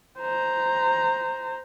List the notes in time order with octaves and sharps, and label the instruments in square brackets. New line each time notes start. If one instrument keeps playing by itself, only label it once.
[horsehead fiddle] C5 A#5